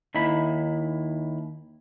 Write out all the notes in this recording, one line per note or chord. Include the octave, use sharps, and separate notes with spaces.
D#2 D#4 E4 B5